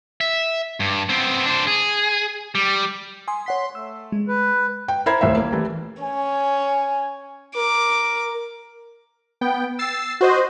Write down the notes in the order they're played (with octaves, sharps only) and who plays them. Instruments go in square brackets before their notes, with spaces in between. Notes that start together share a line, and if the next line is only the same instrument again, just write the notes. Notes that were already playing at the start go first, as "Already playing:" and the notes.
[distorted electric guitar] E5
G2
B3 C4
D4 C5
G#4
G3
[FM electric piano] G#5 C6 D#6
[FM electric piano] C#5 F#5 B6 [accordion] C6
[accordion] A3 [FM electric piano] E6
[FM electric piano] G#3
[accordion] B4
[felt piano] G5
E4 A#4 C5 A#5 B5 G#6
D#1 C2 A2 C5 E5
A#3
E3 G3 A3
[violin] C#4 [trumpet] G#5
[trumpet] A#4 [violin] D6
[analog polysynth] B3 G5
E6 A6 C7
F#4 C5 D#5